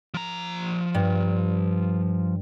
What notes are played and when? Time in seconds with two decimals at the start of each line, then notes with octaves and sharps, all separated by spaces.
0.14 F3 A#5
0.95 G2